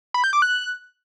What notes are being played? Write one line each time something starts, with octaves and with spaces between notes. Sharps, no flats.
B5
G6
D6
F#6